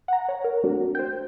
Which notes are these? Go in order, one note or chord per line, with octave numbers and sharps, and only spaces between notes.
F#5 A#5
C#5
A#4
A3 A#3 C4 D4 F#4
C5 G5